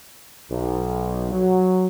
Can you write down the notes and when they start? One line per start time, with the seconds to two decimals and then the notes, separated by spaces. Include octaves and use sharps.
0.51 B1
1.31 F#3